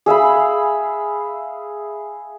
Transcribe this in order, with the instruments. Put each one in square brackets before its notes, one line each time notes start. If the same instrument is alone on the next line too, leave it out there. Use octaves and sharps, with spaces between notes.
[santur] G#4 E5 F5 B5